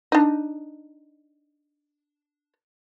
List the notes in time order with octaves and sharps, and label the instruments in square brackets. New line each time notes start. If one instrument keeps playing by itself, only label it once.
[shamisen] D4 D#4